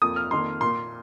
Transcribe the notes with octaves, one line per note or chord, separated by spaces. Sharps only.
F2 F3 A#3 D#6
F6
F2 D#3 A#3 C6
A#2 A#3 C6